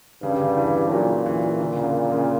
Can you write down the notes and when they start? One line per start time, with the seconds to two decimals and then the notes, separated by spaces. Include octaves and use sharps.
0.22 G2 C#3
0.33 D3
0.44 C#3
0.57 E3
0.91 A#2 F#3
1.26 E3
1.60 D3
1.77 C#3
2.12 C#3